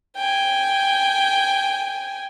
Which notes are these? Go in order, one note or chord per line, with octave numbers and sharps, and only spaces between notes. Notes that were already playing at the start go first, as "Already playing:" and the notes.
G5 G#5